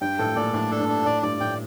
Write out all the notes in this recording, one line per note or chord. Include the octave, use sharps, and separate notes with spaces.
G2 G5
A2 A4
A#2 D5
A2 D4
A4
G2
D4
A2 D5
G2 D5
A2 G5